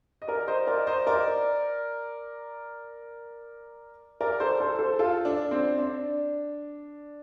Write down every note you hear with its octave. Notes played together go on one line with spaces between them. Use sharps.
D#5
A#4 D5
C5 D#5
A#4 D5
C5 D#5
A#4 D5
A#4 D5
A4 C5
A4 C5
A4 C5
F4 A4
D4
C4
D4